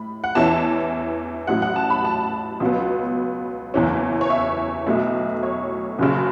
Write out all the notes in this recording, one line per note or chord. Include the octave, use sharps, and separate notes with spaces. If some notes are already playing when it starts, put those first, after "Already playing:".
Already playing: A2 B5
F#5
E2 E3 C#4 E4 A5
A1 A2 F#3 F#5
F#5
A5
B5
A5
C#2 B2 F#3 B3
F#1 E2 E3 C#4
C#5
E5
B1 B2 A3 E4
C#5
F#1 F#2 C#3